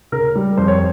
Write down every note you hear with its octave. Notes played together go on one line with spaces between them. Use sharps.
C#3 A#4
G3
F2 C5
C#5